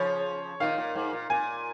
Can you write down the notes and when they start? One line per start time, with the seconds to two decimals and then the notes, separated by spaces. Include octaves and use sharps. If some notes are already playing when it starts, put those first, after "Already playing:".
Already playing: C#3 F3 C#5
0.60 A#2 D#3 F5
0.78 A#2
0.95 G#2
1.13 A#2
1.30 A#2 G#5